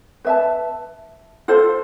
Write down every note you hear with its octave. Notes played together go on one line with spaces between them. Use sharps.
B4 E5 A5
F4 A4 C5